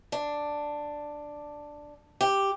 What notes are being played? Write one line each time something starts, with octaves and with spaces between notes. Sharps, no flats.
D4
G4